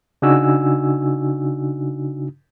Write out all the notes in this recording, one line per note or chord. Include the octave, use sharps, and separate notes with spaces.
C#3 D4 D#4 F#4 G#5 E6